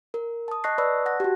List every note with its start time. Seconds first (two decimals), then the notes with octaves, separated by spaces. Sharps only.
0.14 A#4
0.48 A5 D#6
0.64 D#5 A5 C#6 F#6 A#6 C7
0.78 B4 D5 B5 C#6 D#6 E6
1.06 F#5 A5 F#6 A#6
1.20 F#4 G4